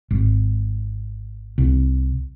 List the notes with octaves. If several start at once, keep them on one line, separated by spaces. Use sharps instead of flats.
G#1
C2